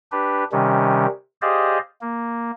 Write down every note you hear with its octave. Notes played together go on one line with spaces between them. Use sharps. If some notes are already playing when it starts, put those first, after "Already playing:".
D4 G4 B4
C3 D#3 G3 C#4
G4 G#4 C5 D5 D#5 F5
A#3